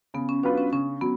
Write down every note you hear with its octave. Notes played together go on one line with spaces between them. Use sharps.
C#3 B3
C#4
F#3 B3 D4 F4 B4
C#4
C#3 C#4
F#3 B3